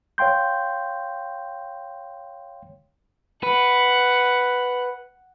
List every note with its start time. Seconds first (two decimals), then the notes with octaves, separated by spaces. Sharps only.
0.18 C#5 F5 G5 C6 G6
3.43 B4 F#5